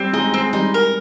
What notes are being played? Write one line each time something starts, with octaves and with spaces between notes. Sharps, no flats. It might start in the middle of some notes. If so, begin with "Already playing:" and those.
Already playing: G3 C4 G4
G#3 D#4 G#4
G#3 C4 G#4
G#4
G3 D#4 G4
A#4